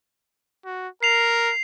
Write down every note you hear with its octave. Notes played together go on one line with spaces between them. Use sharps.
F#4
A#4 C7 F7